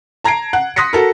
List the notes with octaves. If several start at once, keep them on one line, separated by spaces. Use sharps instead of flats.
A5 A#5 G#6 C7 D7
F#5
C6 D#6 F#6 A#6 B6 C#7
F#4 A4 A#4